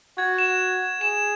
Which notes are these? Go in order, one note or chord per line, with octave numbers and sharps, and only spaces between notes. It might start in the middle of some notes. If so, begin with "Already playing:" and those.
F#4 G#6
E7
G#4 E7